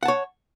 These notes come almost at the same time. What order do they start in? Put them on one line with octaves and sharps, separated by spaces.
F#5 A5 C#5